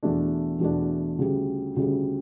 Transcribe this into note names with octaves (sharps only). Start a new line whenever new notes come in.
E2 B2 A3 D4
E2 B2 A3 D4
D2 C#3 G3
D2 C#3 G3